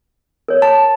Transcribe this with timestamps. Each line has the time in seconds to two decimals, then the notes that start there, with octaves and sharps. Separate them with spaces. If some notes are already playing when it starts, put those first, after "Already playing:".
0.48 A#4 C#5
0.62 A5